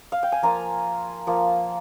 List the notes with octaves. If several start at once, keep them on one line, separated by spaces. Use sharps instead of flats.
F5
G5
G#5
F3 A#3 F4 A#5
F3 A#3 F4